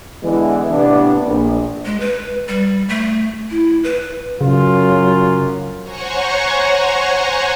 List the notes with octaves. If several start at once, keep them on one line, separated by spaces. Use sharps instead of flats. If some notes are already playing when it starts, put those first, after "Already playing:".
D3 E3 G#3 B3 D4 E4
A2 C3 B3 D4
A#1
G#3
B4
G3
A3
E4
B4
F#2 C#3 F#3 F4
C5 C#5 F#5 G#5 A#5 C#6